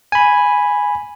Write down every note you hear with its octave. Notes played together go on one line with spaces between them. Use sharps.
G#5 B5